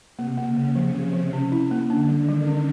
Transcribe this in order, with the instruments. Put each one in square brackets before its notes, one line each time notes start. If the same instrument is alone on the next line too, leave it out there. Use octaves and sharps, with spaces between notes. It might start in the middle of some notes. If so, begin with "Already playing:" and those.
[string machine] C3 [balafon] A#3
[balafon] A#3
[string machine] C#3
[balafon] A#3
[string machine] C3 [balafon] F3
[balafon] F3
F3
C#4
E4
A#3
[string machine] D3 [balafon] D4
[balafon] G3
[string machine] D#3
[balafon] G3
C#4